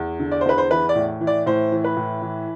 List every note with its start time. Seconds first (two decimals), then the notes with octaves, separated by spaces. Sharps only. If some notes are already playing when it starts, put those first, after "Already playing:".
Already playing: E2
0.20 D3
0.32 D5
0.41 C5
0.45 E2 B4
0.58 C5
0.70 E3 B4
0.89 D5
0.95 A2
1.21 E3
1.27 D5
1.46 A2 C5
1.72 E3
1.84 B4
1.97 A2
2.22 E3